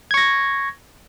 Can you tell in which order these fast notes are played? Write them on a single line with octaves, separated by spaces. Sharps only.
G#6 C#6 A#6